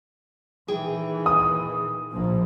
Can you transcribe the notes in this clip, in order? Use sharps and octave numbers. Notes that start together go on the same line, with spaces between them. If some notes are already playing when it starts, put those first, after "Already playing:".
A#2 D#3 E3 G#4 G5
D#6
A#1 F3 A#3